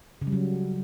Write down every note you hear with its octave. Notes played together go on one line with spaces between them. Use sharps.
C#3
G3
F#3